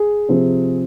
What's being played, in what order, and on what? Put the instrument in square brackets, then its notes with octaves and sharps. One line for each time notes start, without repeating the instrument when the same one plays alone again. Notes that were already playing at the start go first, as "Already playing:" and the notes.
Already playing: [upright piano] G#4
C3 F3 C4